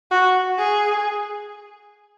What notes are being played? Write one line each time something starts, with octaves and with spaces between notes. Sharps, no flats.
F#4
G#4